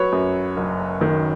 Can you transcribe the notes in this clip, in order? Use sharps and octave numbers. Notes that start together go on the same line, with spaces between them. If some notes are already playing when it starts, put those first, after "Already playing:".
Already playing: F#3 B4 C#5
F#2
F#1
D#3